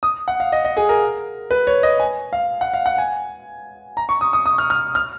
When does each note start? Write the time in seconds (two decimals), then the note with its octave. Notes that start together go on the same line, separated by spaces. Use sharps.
0.03 D#6
0.28 F#5
0.40 F5
0.52 D#5
0.65 D#5
0.77 G#4
0.89 A#4
1.51 B4
1.67 C#5
1.83 D#5
2.00 G#5
2.33 F5
2.61 F#5
2.74 F5
2.86 F#5
2.98 G#5
3.97 A#5
4.09 C#6
4.21 D#6
4.33 D#6
4.46 D#6
4.58 F6
4.70 F6
4.95 F6